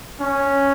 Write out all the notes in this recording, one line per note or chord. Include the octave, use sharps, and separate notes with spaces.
C#4